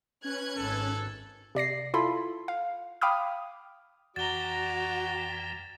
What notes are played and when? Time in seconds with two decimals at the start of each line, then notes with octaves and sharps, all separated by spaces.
0.24 C#4 B4 F#6 G#6
0.57 G#1 A4
1.55 C3 D5 A#6 C7
1.94 E4 F4 A4 B5 C6
2.48 F5
3.01 F5 G5 B5 D6 D#6 F6
4.16 F2 E3 F#4 D5 G5 A#5 A6 G7